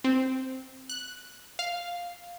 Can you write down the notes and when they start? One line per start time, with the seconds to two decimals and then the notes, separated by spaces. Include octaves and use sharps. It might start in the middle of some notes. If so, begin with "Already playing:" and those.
0.04 C4
0.89 F#6
1.59 F5